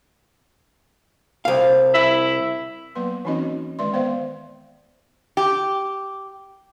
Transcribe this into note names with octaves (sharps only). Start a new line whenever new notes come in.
C2 F5
E4
F#3 A#3 B3 B4 C6
E3 C4 C#4 D#4 F#4 D#5
D#3 G#3 D5 E5 C6
B3 C5 D5 E5 F5
G4